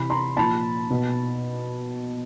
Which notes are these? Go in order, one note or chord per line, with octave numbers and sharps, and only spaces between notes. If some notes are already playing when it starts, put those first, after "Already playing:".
Already playing: C3 E3 B5
A#5 C6
A#2 F3 A5 B5
B2